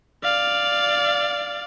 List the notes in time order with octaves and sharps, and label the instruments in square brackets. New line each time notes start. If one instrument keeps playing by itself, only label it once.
[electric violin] D5 F5